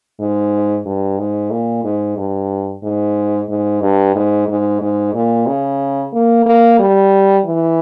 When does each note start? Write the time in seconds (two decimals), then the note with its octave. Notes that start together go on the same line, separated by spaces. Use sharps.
0.20 G#2
0.86 G2
1.19 G#2
1.51 A#2
1.84 G#2
2.17 G2
2.83 G#2
3.49 G#2
3.82 G2
4.15 G#2
4.48 G#2
4.81 G#2
5.14 A#2
5.47 C#3
6.13 A#3
6.46 A#3
6.79 G3
7.45 E3